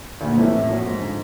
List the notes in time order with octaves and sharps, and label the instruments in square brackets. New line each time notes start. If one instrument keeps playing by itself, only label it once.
[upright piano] D2 [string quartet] A#2
[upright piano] C3 E3 A3 C#4
[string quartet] A2 [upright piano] C3
[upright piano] F3 A#3 C#4 F#4
[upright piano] F2 [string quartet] G#2
[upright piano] D3 F3 G#3